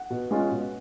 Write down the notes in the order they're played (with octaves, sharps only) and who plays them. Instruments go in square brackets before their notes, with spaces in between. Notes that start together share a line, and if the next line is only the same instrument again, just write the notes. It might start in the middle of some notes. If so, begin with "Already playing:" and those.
Already playing: [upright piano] F#5
B2
G#3 C#4 F4
B2